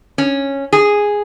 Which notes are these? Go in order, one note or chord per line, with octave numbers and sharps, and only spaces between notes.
C#4
G#4